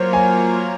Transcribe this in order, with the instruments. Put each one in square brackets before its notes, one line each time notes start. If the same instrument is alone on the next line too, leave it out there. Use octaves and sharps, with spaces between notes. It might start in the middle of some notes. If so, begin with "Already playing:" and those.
Already playing: [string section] F#3 A#3 F4 A#4 C#5 [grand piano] C5
[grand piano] G#5